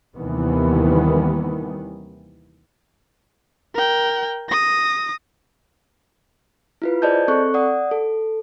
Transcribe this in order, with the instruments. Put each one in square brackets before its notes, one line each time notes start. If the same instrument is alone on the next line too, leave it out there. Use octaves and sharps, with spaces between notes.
[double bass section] D#2 C3 D#3 E3 G3 B3
[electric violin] A#4 G5
D#6 A#6
[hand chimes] E4 F4 B4
G#4 C5 D5 D#5 A5 G6
C4 A4 C#6 F#6
D5 F#5 D#6
A4